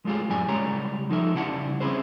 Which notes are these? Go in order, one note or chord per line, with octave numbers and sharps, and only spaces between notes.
G#3 A3 F4 G4 G#4
F#2 A2 G3 G#5
C#3 G3 G#3 G4 C#5 A#5
F3 D#4 A4 E5
C#3 G3 E4 F#5 A5
C4 C#4 E4 G#4 C5